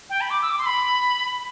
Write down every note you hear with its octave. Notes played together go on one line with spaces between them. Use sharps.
G5
B5
D6
E6
D6
C6
B5